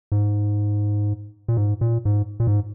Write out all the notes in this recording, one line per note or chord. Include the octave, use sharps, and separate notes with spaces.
G#2
A#2
G#2
A#2
G#2
A#2
G#2